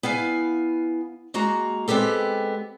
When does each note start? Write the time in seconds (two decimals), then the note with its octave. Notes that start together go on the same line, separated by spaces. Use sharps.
0.03 B3 E4 F5 G#5
1.34 G#3 A#3 F#4 A#5
1.88 G#3 B3 C4 G4 A4